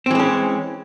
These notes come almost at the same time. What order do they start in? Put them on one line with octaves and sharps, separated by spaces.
C4 E3 G#3 C#4